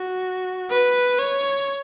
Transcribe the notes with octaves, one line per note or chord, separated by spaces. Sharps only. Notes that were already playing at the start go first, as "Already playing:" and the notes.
Already playing: F#4
B4
C#5